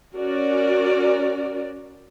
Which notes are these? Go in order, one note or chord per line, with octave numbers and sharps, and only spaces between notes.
C#4 F#4 A#4 D5